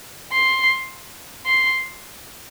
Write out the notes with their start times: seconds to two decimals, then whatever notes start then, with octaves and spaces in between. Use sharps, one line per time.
0.32 C6
1.46 C6